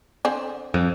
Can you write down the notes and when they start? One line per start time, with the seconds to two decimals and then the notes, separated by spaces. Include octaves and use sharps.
0.25 D3 C4 G#5
0.74 F2